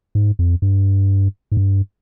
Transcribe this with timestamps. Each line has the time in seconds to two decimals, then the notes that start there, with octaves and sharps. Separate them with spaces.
0.15 G#2
0.39 F2
0.62 G2
1.52 G#2
1.57 G2